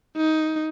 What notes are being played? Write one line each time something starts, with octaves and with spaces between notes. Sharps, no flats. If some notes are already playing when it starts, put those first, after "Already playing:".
D#4